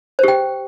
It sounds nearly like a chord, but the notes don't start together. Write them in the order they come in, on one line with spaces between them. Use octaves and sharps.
C5 G4 G5